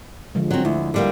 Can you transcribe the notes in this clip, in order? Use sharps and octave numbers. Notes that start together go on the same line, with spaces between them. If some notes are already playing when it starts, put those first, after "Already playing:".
D3 F3 G#3
F#3 C4
D2 E4
D3 G3 A#3